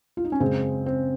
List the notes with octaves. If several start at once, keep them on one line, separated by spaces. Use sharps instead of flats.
F4
D#4
C#4
F#2 C#3 G#3 C4
C4